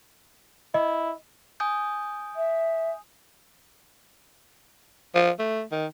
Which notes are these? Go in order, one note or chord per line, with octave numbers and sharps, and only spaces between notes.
E4 D#5
G#5 D#6 G6
E5
F3
A3
D#3